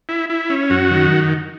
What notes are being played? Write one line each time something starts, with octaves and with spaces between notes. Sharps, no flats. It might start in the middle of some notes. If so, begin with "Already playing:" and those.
E4
E4
C#4
F#2 F#4
D#3